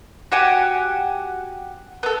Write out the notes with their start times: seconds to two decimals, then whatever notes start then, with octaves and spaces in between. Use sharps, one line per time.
0.32 F#4 G4 F#5 G#5
2.03 B3 A4